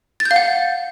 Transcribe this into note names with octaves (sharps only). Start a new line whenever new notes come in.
A6
G6
F5
F#5